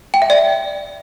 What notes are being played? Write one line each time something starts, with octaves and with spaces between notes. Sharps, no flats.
G5
E5
D5